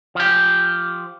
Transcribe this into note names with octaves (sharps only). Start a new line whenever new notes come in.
F3 G4